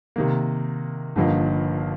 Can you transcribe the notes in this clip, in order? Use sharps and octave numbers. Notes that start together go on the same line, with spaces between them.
C3 D#3 A#3
G1 G2 F3 A#3 D#4